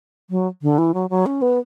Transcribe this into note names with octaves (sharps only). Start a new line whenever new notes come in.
F#3
D3
E3
F#3
F#3
C#4
B3